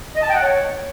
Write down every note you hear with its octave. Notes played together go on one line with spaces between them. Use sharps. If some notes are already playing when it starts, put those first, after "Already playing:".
D#5
A5
G5
F#5
C#5